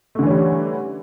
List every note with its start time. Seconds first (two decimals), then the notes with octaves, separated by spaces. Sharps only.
0.15 A3
0.19 D3
0.23 E3
0.27 C#4
0.30 G3